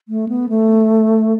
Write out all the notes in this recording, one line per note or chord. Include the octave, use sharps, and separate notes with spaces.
A3
B3
A3